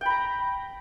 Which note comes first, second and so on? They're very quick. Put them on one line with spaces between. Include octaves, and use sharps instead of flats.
G5 B5 A#5